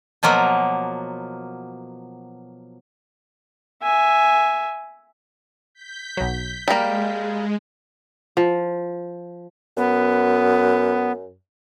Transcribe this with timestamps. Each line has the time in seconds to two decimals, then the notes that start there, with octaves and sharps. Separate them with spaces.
0.23 B2 F3 F#3 A#3
3.83 E5 G#5
5.74 G6 B6
6.17 B1 F#3
6.68 G3 G#3 A#3 F6 A#6 B6
8.37 F3
9.77 F#2 B3